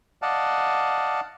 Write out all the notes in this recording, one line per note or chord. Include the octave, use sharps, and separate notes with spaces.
D5 D#5 F5 F#5 A5